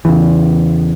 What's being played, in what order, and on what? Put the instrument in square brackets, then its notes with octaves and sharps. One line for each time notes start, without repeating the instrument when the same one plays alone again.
[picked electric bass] E2 C#3 E3